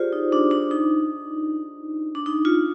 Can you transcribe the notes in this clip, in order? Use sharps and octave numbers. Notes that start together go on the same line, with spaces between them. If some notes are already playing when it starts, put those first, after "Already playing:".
Already playing: F4 G4 G#4 C5 D5
D#4
D4
D4
D#4
D4
D#4
F4